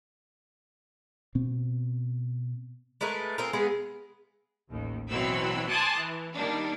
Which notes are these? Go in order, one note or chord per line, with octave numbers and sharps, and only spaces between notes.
B2 C4
G#3 A3 A#4 B4
C4 F4 G#4 A#4
G#3 B3 G#4 F5
A1 D#2
B2 E3 F#3 C4 B5 E6
G#5 A5 C6 D6 D#6 F#6
E3
D#3 G3 A#3 D4